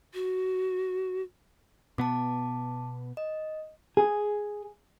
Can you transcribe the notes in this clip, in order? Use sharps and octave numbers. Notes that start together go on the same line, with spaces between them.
F#4
B2 B3 A5 D6
D#5
G#4